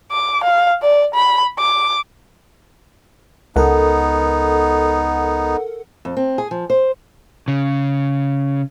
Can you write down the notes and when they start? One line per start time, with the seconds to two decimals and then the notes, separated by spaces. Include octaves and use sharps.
0.12 D6
0.44 F5
0.82 D5
1.14 B5
1.58 D6
3.56 C#2 B3 D#4 A4 A#4 F#5
6.05 F2
6.17 C4
6.38 G#4
6.51 F3
6.70 C5
7.48 C#3